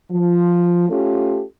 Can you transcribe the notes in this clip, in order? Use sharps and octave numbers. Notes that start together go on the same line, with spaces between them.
F3
A3 C#4 F4 G4 A4